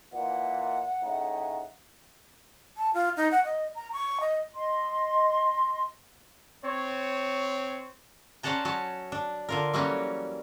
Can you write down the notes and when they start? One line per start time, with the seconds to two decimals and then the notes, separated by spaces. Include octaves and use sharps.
0.13 A#2 E3 F#5
1.02 A2 C#3 D#4
2.77 A5
2.94 F4
3.17 D#4
3.32 F#5
3.45 D#5
3.75 A#5
3.93 C#6
4.21 D#5
4.55 D#5 C6
6.65 C4 C#5
8.43 C#4 C5 D5 F#5 A5 A#5
8.65 F#3 C#4 A5
9.12 D4
9.49 D3 F4 A#4
9.74 E3 F#3 G3 A#3 C#4